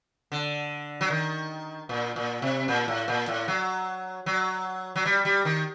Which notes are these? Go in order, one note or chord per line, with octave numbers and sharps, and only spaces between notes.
D3
F#3
D#3
A#2
A#2
C3
A#2
A2
A#2
A2
F#3
F#3
F#3
G3
G3
D#3